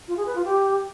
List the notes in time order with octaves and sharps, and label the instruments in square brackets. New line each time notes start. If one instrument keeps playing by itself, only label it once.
[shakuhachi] F4
G#4
B4
F4
G4